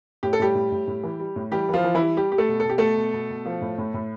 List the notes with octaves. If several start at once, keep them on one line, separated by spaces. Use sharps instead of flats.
A2 G4
A4
A2 G3 G4
A2
A2
A2
E3
G3
A2
E3 G3 G4
E3 F3 F4
E3
E3 E4
G3
G3 G4
G3 G4
A3 A4
B2
A4
B2 G4
B2 A3 A4
B2
B2
B2
F3
A2
A2
A2